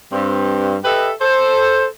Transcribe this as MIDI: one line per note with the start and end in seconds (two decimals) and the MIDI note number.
0.13 0.75 43
0.13 0.75 60
0.84 1.12 67
0.84 1.12 69
0.84 1.12 71
0.84 1.12 75
0.84 1.12 76
1.22 1.86 69
1.22 1.86 72